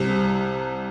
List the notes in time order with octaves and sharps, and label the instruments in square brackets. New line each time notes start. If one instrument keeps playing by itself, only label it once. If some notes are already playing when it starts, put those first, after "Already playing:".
Already playing: [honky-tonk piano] C2 C3